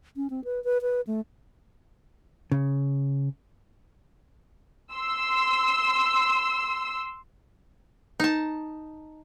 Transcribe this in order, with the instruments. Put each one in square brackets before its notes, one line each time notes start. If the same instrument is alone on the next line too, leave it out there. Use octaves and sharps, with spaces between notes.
[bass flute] C#4
C4
B4
B4
B4
A3
[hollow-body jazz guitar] C#3
[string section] C6 E6
[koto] D#4 A5